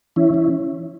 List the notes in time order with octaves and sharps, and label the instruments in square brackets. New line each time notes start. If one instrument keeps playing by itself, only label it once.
[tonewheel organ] E3 C#4 E4
E3